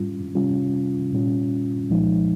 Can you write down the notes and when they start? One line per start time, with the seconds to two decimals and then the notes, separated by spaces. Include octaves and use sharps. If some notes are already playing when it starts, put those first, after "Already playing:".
Already playing: G#2 G3 C#4 F4
0.35 C3 G3 C#4 F4
1.12 A#2 G3 C#4 F4
1.89 C2 A#2 F3 G#3 D#4